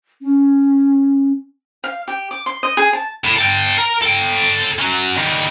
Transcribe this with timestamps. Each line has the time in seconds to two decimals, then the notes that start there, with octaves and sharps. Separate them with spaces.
0.22 C#4
1.84 F5
2.08 G4
2.31 D6
2.46 C6
2.63 D#5
2.77 G#4
2.93 A5
3.24 A2
3.37 A4 G5
3.78 A#4
4.02 A4 G5
4.79 F#3 C#4
5.18 D#3 G3